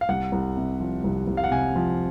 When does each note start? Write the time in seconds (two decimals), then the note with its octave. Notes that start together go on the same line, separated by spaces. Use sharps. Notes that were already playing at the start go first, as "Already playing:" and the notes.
0.01 F5
0.09 C2 F#5
0.32 C2
0.57 C3
0.80 F3
1.04 C2
1.27 C2
1.37 F5
1.44 F#5
1.51 C3 G#5
1.76 F3